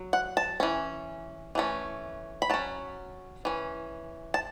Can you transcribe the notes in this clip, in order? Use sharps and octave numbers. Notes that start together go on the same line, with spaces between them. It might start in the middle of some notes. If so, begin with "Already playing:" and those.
Already playing: F#3
F#5
A5
E3 C#4
E3 A3 C#4
B5
F#3 C#4 A5
E3 C#4
A5